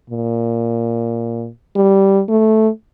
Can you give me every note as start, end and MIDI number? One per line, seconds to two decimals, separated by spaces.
0.10 1.48 46
1.76 2.22 55
2.29 2.68 57